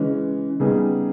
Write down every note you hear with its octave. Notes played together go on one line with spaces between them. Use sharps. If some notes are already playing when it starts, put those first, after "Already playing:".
Already playing: C#3 E3 G#3 C#4
C#3 G3 B3 D#4 G#4